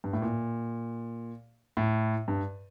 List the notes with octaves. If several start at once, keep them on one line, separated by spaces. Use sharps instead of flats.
G2
A2
A#2
A2
G2